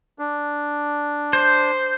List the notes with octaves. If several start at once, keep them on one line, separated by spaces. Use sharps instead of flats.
D4
C5